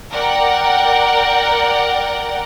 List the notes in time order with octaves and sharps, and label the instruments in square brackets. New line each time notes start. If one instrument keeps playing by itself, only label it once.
[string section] A#4 D5 F#5 G5